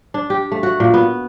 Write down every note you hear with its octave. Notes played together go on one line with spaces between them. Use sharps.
D4
G4
A3
F#4
A#2
B3